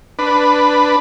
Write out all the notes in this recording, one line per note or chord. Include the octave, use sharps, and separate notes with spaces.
D4 B4